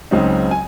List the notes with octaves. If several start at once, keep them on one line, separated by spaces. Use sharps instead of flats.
C#2 C#3 F#3 C4 D#4
G#5